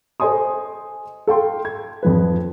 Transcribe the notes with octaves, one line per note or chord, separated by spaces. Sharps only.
A4 C5 D#5 G#5 C6 D#6
A4 F5 G5 C6
G#6
F2 F3 B4